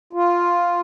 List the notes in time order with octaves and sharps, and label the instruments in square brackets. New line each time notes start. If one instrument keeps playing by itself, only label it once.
[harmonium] F4